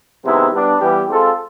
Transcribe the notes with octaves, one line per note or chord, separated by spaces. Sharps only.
C3 D#3 G#3 B3 E4
G3 B3 D4
E3 G3 B3 E4 G4
G#3 C4 F4 A4